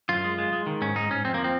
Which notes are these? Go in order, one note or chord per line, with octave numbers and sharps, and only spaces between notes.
F#2 F4
G#3
G#3
G#3
D#3
G#2 C#4
G#2 D#4
G#2 C#4
F2 C4
A#3
F3
C4